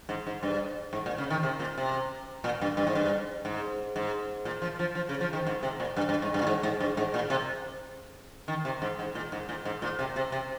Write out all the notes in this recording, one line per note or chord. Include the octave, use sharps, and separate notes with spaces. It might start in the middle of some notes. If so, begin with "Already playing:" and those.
G#2
G#2
G2
G#2
A#2
C#3
D#3
C3
A#2
C3
A#2
G2
G2
G#2
G2
G#2
G#2
A#2
F3
F3
F3
C#3
F3
D#3
G#2
C3
A#2
G2
G2
G#2
G2
A#2
G#2
G#2
G2
G#2
A#2
C3
D#3
C3
G#2
G#2
A#2
G#2
A#2
G#2
A#2
C3
C3
C3